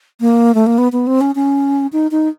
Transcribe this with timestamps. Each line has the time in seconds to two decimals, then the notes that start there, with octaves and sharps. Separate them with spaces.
0.21 A#3
0.55 A3
0.67 A#3
0.78 B3
0.92 B3
1.07 C4
1.21 C#4
1.35 C#4
1.93 D#4
2.11 D#4